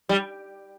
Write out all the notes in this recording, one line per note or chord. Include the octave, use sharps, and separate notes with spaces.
G3